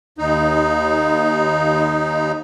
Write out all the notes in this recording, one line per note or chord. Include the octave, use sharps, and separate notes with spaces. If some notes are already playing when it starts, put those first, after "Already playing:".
D#2 D#4